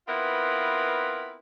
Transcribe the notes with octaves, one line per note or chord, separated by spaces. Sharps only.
B3 C4 E4 F4 A#4 B4